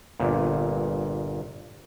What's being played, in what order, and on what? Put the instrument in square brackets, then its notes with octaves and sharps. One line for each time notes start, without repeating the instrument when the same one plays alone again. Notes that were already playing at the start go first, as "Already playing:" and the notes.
[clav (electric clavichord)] G1 A#2